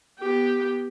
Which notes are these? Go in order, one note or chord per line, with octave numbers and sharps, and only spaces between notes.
B3 G4